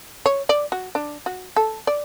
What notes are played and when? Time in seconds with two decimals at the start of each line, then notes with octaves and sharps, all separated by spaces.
0.26 C#5
0.49 D5
0.72 F#4
0.95 D4
1.26 F#4
1.56 A4
1.87 D5